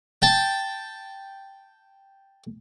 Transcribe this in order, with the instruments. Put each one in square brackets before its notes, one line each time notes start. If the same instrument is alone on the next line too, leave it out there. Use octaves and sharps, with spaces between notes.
[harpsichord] G5 A5